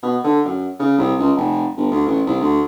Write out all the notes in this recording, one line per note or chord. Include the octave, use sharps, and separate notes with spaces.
B2
D3
F#2
C#3
C2
C#2
F1
G1
D2
A1
C2
D2